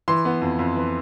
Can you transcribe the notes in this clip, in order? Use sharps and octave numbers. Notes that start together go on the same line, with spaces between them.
E3 C6
B3
F2
F2
E3